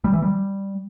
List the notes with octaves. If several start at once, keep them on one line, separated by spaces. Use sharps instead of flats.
G3
E3
G3